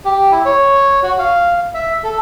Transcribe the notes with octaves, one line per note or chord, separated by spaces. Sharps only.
G4
E4
C#5
F#4
F5
E5
A4